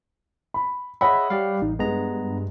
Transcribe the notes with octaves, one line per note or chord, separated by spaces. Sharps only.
B5
G#4 C#5 D#5 E5 F#5 B5
G3 G4 D5 F5
A1 D#4
G2 G#3 B3 A#5